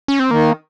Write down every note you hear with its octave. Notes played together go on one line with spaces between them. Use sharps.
C#4
C4
D#3 A#3